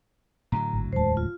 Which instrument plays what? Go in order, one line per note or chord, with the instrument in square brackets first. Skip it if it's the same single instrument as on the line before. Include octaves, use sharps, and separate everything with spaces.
[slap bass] A2 D3 F#3 [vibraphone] A#5
[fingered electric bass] G#1
[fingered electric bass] D1 E2 G#3 [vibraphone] C5 A5
[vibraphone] F4